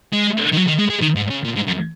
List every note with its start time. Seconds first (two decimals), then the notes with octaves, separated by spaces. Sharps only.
0.13 G#3
0.52 D#3
0.57 F#3
0.67 D#3
0.79 G#3
0.90 G#3
1.02 D#3
1.16 G#2
1.30 C#3
1.45 A#2
1.56 G#2
1.67 F#2